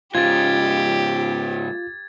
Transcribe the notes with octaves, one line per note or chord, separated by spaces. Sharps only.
G#2 C#3 F4 G4 G#6 A6